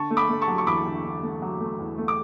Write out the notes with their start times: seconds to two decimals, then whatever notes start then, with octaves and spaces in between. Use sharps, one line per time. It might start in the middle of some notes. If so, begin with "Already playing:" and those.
Already playing: D3 A5 C#6
0.11 A3
0.17 B5 D6
0.29 A3
0.42 A5 C#6
0.48 F#3
0.58 C#6
0.67 E2 B5 D6
0.86 D3
1.04 D3
1.23 A3
1.42 F#3
1.60 A3
1.79 E2
1.98 A3
2.08 D6